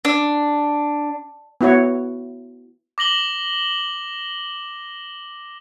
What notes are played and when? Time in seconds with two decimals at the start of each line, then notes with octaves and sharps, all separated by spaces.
0.05 D4
1.61 B3 E4 F#4 C#5
2.98 D6 A#6 F#7 G7